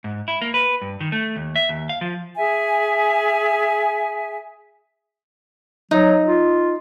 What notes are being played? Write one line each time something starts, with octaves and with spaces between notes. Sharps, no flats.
G#2
E4
A#3
B4
G2
D#3
A3
D#2
E5
D#2
F5
F3
G#4 E5 G#5
F#3 D#4
F4